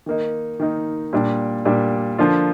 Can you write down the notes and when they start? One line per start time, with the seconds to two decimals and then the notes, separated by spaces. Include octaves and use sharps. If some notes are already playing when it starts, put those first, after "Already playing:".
0.06 D#3 A#3 D#4
0.60 D#3 A#3 D#4
1.13 A#2 G3 D4
1.65 A#2 G3 D4
2.18 D3 F3 A#3 D4 F4